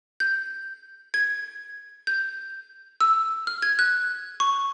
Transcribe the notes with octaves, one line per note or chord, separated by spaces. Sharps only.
G6
G#6
G6
E6
F6
G#6
F#6
C#6